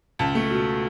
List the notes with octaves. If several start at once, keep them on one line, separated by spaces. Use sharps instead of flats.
C#2 A5
A3
B2